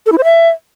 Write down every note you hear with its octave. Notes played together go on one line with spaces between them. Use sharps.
A4
E4
C5
E5